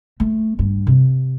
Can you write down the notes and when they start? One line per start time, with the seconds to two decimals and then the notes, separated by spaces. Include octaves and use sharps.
0.20 A3
0.59 G2
0.87 C3